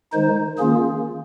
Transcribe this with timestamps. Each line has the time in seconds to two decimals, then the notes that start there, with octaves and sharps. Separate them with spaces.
0.13 D#3 G#3 D#4 C5
0.59 D#3 A#3 C#4 F4 G#4